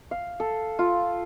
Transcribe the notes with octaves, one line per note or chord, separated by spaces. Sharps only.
F5
A4
F4